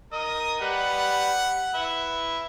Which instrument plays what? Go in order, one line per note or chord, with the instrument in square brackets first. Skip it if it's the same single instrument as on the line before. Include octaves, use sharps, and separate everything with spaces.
[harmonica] A#4 D#5 [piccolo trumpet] D#6
[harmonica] G3 B4 [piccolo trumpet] F#5
[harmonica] B4 E5